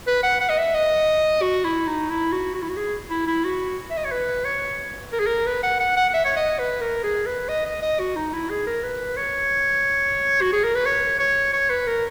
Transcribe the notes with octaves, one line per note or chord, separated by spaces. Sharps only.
B4
F#5
F#5
D#5
E5
D#5
F#4
E4
D#4
E4
F#4
F#4
E4
F#4
G#4
E4
E4
F#4
E5
D#5
C#5
B4
C#5
A#4
G#4
A#4
B4
F#5
F#5
F#5
F#5
E5
C#5
D#5
B4
A#4
G#4
B4
D#5
D#5
D#5
F#4
D#4
E4
G#4
A#4
B4
C#5
F#4
G#4
A#4
B4
C#5
C#5
C#5
B4
A#4